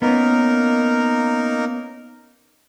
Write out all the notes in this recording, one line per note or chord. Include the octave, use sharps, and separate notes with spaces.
A#3 B3 C#4 D#4 A#4